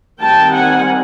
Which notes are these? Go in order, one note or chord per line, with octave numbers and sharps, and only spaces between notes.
D#3 G3 C4 G5 A5
F#5 G#5